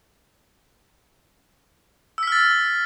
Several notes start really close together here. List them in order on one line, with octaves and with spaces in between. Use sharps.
E6 B6 F6 A6